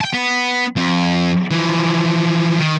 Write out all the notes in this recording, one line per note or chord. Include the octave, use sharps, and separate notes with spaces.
G5 A5
B3
F2
E3 F3
D#3